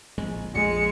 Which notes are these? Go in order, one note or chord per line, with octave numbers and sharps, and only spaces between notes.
D1 A#1 G#3
A#1 F2 G#3 C#7